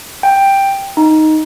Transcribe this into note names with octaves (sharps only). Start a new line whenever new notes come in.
G5
D#4